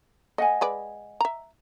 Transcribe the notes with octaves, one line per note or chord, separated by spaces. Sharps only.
A3 D#5 F#5 G#5
G#3 B4 D5
E5 A#5